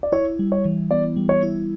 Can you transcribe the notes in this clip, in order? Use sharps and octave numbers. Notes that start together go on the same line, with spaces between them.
D5
E4 C#5
G3
C#5
E3
B3 D5
G3
C#5
E4